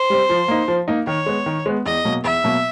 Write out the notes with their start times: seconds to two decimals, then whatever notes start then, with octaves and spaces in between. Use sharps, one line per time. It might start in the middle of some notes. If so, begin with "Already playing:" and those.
Already playing: C5
0.10 G3 C4
0.29 F3
0.48 A#3 D#4
0.68 F3
0.88 A#3 D#4
1.07 D#3 C#5
1.26 G#3 B3
1.46 D#3
1.66 G#3 B3
1.86 E2 D#5
2.05 B2 F#3 A#3
2.24 E2 E5
2.44 B2 F#3 A#3